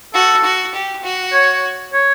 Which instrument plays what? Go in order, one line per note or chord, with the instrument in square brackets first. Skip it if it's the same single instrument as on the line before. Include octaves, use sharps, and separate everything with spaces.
[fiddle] F#4 [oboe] A4
[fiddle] F#4
G4
F#4
[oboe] C#5
C#5